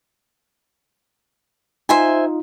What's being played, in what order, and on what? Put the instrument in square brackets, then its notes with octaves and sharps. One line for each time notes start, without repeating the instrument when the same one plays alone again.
[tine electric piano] D#4 F4 [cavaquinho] C5 E5 G#5